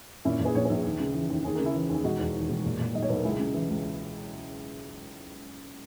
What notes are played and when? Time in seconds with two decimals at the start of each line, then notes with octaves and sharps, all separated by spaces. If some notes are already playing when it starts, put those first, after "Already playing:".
0.25 A#2 C#4 E4
0.39 A#2
0.45 G#4 B4
0.55 A#1 C#5
0.65 A#1 G#4 B4
0.84 D#2
1.00 C#3
1.15 E3
1.30 D#2
1.44 D#2 G#4
1.55 C#3 A#4
1.66 E4 G#4
1.75 E3
1.89 D#2 G#4
2.04 E1 D#4 F#4
2.19 E2
2.34 D#3
2.50 E1
2.65 A#2
2.79 A#2
2.94 B1 D#5
3.02 C#5
3.09 B1 B4
3.16 A#4
3.24 C#2 E4 G#4
3.40 C#3
3.54 E3
3.69 C#2